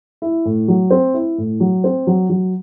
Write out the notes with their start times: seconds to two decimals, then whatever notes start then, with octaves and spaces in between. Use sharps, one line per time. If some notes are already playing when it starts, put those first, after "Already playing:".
0.22 E4
0.45 A2
0.68 F#3
0.90 C4
1.14 E4
1.38 A2
1.60 F#3
1.84 C4
2.07 F#3
2.29 F#3